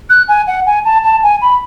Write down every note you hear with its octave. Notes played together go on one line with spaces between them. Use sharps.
F#6
G#5
F#5
G#5
A5
A5
G#5
B5